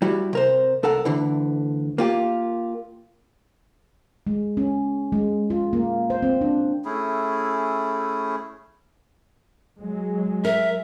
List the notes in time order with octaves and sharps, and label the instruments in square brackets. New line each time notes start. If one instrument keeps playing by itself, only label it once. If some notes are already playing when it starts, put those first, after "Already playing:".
[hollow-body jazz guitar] G3 E4 F#4
C3 A#4 C5
C2 A4 A#4 F#5
D2 D3 E3
A#3 F4 G4
[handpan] G#3
C#4
G#3
F4
A#3
C5
C4
D4
[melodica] A3 C#4 E4 G#4
[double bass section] F#3 G#3
[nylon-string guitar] A#4 [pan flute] E5